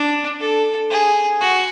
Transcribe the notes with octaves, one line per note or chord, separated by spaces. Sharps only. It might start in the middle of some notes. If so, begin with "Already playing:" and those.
Already playing: D4
A4
G#4
F#4